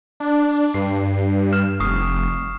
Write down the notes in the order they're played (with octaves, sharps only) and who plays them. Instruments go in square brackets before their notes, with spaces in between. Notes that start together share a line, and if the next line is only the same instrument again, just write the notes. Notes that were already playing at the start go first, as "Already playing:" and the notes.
[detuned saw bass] D4
[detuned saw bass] G2 [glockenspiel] C7
[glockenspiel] F6 E7
[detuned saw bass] F1 [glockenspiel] C#6 D#6 C7